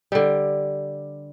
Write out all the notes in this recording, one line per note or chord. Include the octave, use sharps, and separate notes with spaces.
D3 G3